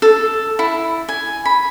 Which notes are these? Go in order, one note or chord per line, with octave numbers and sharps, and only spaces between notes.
A4
E4
G#5
B5